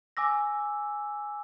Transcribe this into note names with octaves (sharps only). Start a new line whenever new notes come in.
G#5 D6 E6 A#6